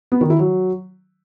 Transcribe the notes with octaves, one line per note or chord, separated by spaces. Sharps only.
B3
D#3
E4
F#3